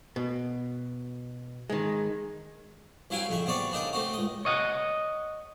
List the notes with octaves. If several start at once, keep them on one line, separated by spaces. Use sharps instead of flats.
B2
D#3 G#3
C2 F#3 E4 F5 G5 G#5
F2 C#3 E5
F#3 B3 C4 C#5 D5
C#3 D4 D#4 A#4
A3 C4 F#4
C#2 D#5
C#5 D#5 F5 F#5